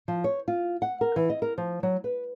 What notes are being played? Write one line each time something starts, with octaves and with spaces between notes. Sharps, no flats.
F3
C#5
F4
F#5
A#4
E3
D#5
A#4
F3
F#3
B4